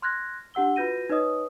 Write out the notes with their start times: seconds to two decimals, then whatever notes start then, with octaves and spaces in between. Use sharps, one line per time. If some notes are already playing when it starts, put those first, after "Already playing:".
0.02 C6 F6 F#6 G#6 A#6
0.54 D4 G4 F#5 E6 G7
0.76 F4 F#4 B4 G6 A#6 D#7
1.10 D#4 B4 C#5 D#5 D#6